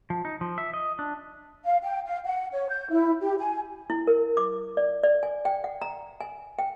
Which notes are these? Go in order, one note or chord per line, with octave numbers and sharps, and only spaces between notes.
F3
D#4
F3
E5
D#5
D4
F5
G5
F5
F#5
C#5
G6
E4
G4
G#5
E4
A#4
D6
D5
D5
G#5
G5
F#5
A#5
G#5
G5